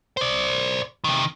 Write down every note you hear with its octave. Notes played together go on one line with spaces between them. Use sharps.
C5 D5
C3 D#3